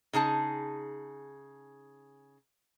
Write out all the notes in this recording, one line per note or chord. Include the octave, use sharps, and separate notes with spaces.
C#3 D#4 G#4 A5